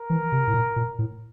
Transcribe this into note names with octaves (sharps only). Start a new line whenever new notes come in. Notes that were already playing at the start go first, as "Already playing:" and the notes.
Already playing: A#4
E3
C3
A2
A#2
A#2
A2